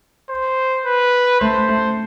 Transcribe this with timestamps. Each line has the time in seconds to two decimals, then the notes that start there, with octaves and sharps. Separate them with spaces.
0.30 C5
0.86 B4
1.41 A3 C5
1.69 A3